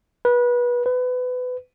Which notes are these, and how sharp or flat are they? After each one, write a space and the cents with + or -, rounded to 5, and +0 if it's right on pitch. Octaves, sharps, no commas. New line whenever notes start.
B4 -25
B4 +25